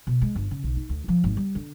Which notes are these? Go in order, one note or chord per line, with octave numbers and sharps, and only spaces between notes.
B2
G#3
G1
C#3
B1
D#4
D2
F3
G#1
G3
D3